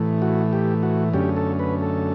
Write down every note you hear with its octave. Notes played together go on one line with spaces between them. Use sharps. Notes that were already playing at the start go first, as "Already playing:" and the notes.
Already playing: A2 E3 A3
F#4
G4
F#4
F#2 D3 A3 C#4 G4
A4
B4
A4